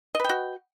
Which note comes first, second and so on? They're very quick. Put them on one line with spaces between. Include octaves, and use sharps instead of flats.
D#5 B4 G5 F#4